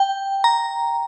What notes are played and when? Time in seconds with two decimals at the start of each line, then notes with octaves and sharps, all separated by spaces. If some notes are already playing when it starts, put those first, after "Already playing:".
Already playing: G5
0.44 A#5